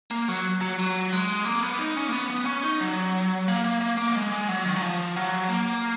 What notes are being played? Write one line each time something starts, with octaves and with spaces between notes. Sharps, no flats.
A#3
F#3
F#3
F#3
G#3
A#3
B3
D#4
C#4
A#3
B3
B3
C#4
D#4
F#3
A#3
A#3
A#3
A#3
F#3
G#3
G#3
F#3
D#3
F#3
F3
F#3
A#3